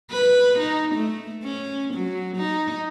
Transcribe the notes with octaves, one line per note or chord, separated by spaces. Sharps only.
B4
D#4
A3
C#4
F#3
D#4